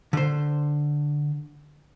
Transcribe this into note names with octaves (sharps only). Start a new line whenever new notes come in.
D3 C5